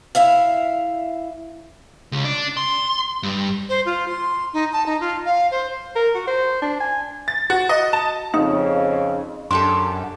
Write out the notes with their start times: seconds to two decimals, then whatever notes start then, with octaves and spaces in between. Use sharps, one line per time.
0.15 E4 E5 F5
2.12 C#2
2.24 D4
2.57 C6
3.23 G2
3.69 C5
3.86 F4
4.08 C6
4.53 D#4
4.73 A5
4.86 D#4
5.00 F4
5.26 F5
5.51 C5
5.96 A#4
6.14 F#4
6.27 C5
6.62 D4
6.80 G#5
7.28 A6
7.50 F#4
7.69 D#5
7.93 A5
8.34 F2 C#3 D#4
9.51 F#2 D4 G4 A4 C6